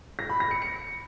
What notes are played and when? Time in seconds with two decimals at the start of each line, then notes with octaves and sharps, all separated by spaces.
0.19 A#6
0.29 B5
0.40 A#6
0.51 C#7
0.62 C#7